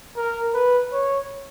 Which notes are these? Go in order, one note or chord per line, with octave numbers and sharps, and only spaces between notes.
A#4
B4
C#5